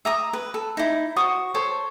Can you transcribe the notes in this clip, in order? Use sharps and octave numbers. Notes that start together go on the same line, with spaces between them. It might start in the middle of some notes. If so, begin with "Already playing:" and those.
E5 A#5 D#6
B4 B5
A4
D#4 E4
F#4 C5 C#6 D#6
A4 C5 C#5